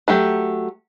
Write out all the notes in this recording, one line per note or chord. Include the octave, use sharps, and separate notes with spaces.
F#3 A3 G4